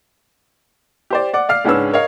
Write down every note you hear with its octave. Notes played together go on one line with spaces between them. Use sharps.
G4 C5 D5
D5 F#5 D6
D5 F5 F6 C7
C#2 G#2 C#4 D4 B4 E6
A#4 C#5 D#5 F5